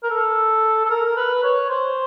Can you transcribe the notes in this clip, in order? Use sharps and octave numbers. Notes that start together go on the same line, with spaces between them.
A#4
A4
A4
A#4
A#4
B4
C#5
C5